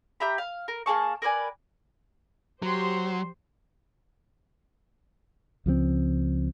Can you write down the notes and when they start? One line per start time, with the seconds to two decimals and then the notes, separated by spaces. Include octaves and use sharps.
0.20 G4 E5 A#5 B5
0.38 F5
0.68 A#4
0.86 A#3 G#4 A5 C#6
1.22 A#4 B4 D5 G#5
2.63 F#3 G4 C5 C6
5.66 C#2 F3 F#3 C4